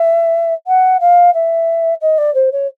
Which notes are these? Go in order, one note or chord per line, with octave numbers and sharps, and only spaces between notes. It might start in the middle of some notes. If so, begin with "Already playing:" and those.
Already playing: E5
F#5
F5
E5
D#5
D5
C5
C#5